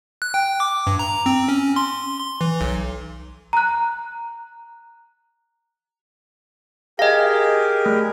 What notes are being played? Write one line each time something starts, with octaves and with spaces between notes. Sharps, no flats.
F#6
G5
D6
G2
A#5
C4
C#4
C6
C6
E3
B1
A#5 F#6
G4 G#4 A#4 D#5 F5
A3